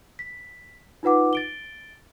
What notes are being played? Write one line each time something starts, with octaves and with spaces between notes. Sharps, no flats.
B6
D#4 F4 B4 F#5 D6
A6 D7 G7